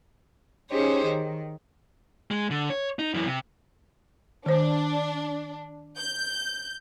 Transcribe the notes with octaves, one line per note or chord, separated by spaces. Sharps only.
C#4 D#4 G4 G#4 C5 C#5
D#3
G#3
D3
C#5
D#4
F#2 E3
C3
D#3 D4 C5
G6